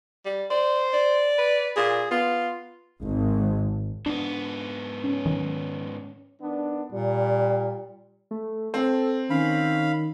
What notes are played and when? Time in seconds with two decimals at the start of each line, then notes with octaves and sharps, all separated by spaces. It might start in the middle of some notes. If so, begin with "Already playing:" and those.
0.25 G3
0.50 C5 D5
0.93 D5
1.38 B4
1.76 A#2 G#4
2.11 B3 F4
3.01 G#1
4.06 G#2 B3 D4
5.04 C#4
5.26 D#3 F#3
6.40 D#3 B3 D4
6.92 A#2 G3
8.31 A3
8.74 C4 A4
9.30 D#3 C#4 F5 B5